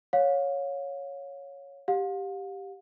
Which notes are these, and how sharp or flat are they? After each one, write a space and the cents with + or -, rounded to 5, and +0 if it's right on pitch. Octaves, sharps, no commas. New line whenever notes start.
C#5 +0 F5 +35
G4 +0 F5 +40